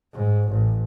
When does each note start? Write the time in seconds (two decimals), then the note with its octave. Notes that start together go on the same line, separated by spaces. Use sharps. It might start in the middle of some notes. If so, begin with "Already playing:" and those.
0.13 G#2
0.49 A1